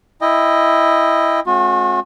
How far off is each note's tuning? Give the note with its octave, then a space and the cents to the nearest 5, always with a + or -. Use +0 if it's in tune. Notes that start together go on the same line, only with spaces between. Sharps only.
E4 +0 D#5 +0 G5 +15
G#3 +35 C4 +45 F#4 -40